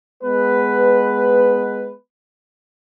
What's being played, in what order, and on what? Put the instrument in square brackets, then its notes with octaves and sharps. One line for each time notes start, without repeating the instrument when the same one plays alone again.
[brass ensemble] G#3 B3 B4